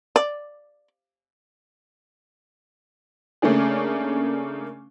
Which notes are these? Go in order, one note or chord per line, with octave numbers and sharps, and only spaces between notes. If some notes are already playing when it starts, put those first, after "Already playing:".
D5
C#3 A3 A#3 C#4 D4 G#4